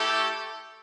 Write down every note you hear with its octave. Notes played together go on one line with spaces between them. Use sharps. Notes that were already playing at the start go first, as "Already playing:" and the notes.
Already playing: A3 E4 G4 A4